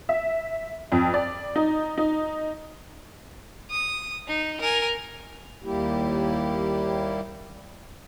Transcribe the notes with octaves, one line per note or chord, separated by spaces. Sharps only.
E5
F2
D5
D#4
D#4
D#6
D#4
A#4 G#5
D#2 G3 A#3 E4 G4